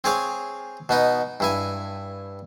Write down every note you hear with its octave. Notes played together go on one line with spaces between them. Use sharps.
C4 G#4 C#5 F5
B2 B3 D#4
G2 E4 G#5